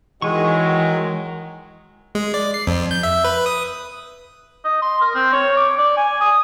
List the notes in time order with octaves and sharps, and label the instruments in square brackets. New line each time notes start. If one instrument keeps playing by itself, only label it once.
[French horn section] D#3 F#3 [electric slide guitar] E3 [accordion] G#3 [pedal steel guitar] G#5 C#6
[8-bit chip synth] G#3
D5
C7
F2
G6
E5
B4
D#6
[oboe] D#5
C6
A#4
C4
C#5
D6
D5
G#5
D#6